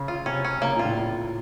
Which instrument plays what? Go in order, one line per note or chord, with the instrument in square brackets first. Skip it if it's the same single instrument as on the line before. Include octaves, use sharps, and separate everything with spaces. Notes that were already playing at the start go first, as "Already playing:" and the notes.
Already playing: [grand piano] C#3
[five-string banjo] F4
[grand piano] C3 [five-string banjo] C#4
[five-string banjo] C#4
[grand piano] C#3 [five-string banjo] A#3
[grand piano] A#2 [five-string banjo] F4
[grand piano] A2